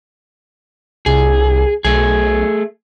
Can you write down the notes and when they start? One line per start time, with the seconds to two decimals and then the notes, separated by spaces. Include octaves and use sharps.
1.06 C2 G#4
1.84 B1 A3 G#4